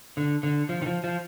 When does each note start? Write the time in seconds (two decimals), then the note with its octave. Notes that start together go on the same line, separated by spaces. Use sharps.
0.17 D3
0.43 D3
0.69 F3
0.82 D#3
0.86 F3
1.04 F3